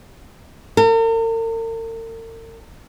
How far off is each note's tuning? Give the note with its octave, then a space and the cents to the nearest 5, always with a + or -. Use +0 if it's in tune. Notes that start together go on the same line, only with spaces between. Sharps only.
A#4 -45